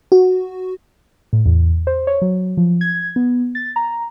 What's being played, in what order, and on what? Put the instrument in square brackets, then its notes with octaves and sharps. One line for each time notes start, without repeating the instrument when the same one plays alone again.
[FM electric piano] F#4
[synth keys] A2
E2
C5
C#5
F#3
F3
G#6
B3
A6
A#5